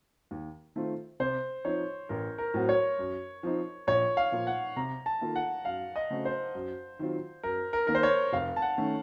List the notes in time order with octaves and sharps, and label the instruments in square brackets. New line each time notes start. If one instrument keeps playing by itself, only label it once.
[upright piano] D#2
D#3 A3 C4 F4
[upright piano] C3 [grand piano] C5
[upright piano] F3 C4 D#4 [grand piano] C#5
[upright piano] A1 [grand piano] A#4
[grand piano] A#4
[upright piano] A2 F#3 C4 F#4
[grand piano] C#5
[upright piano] F#2
F3 C4 D#4
[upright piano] A#1 [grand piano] C#5
[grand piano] F5
[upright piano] A#2 F3 A#3 F4
[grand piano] F#5
[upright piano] C3 [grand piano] A#5
[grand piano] A5
[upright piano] D#3 A#3 F4 A4
[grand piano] F#5
[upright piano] F#2 [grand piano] F5
[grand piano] D#5
[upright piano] C#3 A3 C4 F#4
[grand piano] C5
[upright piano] F#2
D#3 F#3 C4 F4
[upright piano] F#2 [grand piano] A#4
[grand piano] A#4
[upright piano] D#3 A#3 [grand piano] A#4
[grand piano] C5
C#5
[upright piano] F1 [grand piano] F5
[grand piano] A5
F#5
[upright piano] D#3 A3 C#4